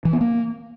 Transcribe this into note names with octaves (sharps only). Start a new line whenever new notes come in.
E3
B3
A#3